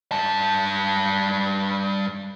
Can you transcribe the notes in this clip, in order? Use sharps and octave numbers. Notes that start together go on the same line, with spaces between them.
G2 A5